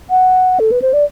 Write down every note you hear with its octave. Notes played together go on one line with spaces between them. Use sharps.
F#5
A4
B4
C5
D5